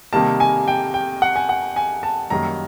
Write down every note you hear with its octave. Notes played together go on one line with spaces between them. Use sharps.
C3 D#3 G3 A#3 A5
G#5
G5
G5
F#5
G#5
F#5
G#5
A5
F#2 D#3 G3 A#3 A#5